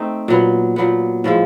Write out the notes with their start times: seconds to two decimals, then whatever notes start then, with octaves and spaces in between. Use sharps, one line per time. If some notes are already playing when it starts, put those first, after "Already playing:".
Already playing: A3 C4 D#4
0.28 A#2 F#3 B3
0.76 A#2 F#3 B3
1.24 A2 F3 G#3